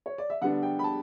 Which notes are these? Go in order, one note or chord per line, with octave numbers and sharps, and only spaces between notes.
C#5
D5
E5
D3 G3 B3 D4 F#5
G5
B5
A5